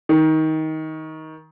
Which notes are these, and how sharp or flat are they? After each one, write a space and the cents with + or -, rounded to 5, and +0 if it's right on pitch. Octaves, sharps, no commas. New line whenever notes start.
D#3 +20